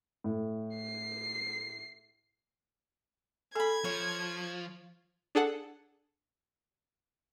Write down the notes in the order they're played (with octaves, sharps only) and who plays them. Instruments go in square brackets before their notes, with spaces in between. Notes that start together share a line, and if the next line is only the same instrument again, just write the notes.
[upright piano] A2
[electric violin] C7
[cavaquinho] G#4 B5 [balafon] A4 [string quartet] G#6
[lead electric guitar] F3 [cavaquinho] C#5
[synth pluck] D4 G#4 A4 F#5